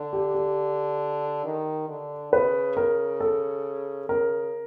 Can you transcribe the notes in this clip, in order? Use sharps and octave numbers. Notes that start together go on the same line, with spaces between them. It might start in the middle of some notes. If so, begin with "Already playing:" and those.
Already playing: D3
G4
G4
D#3
D3
C#3 B4
A#4
A4
C#3 A#4